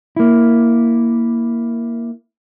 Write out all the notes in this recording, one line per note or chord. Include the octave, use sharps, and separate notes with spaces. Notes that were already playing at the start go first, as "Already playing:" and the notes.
A#3 E4